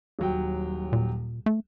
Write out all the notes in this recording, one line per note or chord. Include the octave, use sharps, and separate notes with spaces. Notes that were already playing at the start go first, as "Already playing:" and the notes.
D#1 F#3 G5
A#2
A3